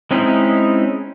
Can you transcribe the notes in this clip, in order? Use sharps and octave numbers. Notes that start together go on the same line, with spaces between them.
G#3 C4 C#4 D#4 E4